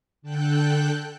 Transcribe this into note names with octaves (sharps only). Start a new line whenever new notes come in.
D3 A4 G5 F#6 G6